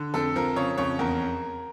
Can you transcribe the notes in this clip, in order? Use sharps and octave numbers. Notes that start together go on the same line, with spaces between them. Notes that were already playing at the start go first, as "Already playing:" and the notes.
Already playing: D3
F2 A4
F3 A#4
C#3 C#5
F2 C#5
E2 A#4